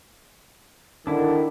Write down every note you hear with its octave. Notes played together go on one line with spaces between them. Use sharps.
D3 D#3 D4 E4